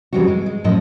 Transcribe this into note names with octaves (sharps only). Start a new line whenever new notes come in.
F2 C#3 E3 G3 C4 F#4
G#3
G#3
F#2 A2 F3 A4 D#5